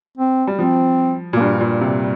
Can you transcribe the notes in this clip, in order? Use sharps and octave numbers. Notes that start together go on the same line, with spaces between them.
C4
G3
F3 C4
A#2
A#3
G2 G3
A#2
C3